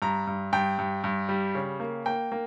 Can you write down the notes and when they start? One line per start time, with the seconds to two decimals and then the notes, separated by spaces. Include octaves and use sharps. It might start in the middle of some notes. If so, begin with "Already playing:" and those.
0.02 G2 A#5
0.27 G2
0.53 G2 G5
0.79 G2
1.04 G2
1.29 G3
1.55 C#3
1.80 A#3
2.06 A#3 G5
2.32 A#3